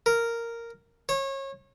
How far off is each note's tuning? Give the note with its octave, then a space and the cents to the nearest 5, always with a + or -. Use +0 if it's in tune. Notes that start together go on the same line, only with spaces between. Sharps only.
A#4 -5
C#5 -30